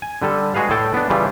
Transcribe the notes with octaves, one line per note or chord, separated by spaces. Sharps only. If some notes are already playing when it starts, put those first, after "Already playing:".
G#5
D3 G3 A4
G#3 F#4 G#4 B4 F5
A2 A4 G5 A5
B3 D4
C#3 E3 G3 F4